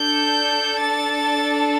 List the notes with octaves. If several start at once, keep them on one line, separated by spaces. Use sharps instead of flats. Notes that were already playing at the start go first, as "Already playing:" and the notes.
Already playing: D4 A4 G6
A6